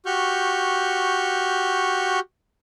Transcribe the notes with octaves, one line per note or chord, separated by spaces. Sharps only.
F#4 G4 C#6 F6 G6